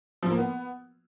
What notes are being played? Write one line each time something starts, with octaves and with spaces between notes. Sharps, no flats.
F3
A#3
B3